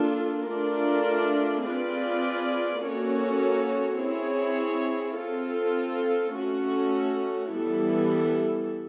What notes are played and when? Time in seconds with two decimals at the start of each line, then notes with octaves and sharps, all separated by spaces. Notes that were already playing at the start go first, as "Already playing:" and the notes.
Already playing: A#3 D4 F4 A4
0.47 A3 D4 F4 A#4 D5
1.65 C4 F4 G#4 B4 D5
2.82 A#3 C#4 F#4 A4 C#5
3.99 C4 E4 G#4 C#5
5.18 C4 F4 A4
6.34 A3 C#4 F#4 A4
7.53 E3 G3 B3 E4 A4